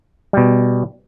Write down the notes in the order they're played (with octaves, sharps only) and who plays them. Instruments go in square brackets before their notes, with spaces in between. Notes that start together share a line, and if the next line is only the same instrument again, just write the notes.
[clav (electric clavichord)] B2 G3